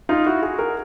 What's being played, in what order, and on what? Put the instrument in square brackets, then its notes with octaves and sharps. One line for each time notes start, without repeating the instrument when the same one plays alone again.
[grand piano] D#4 F4
E4 F#4
F#4 G#4
G#4 A#4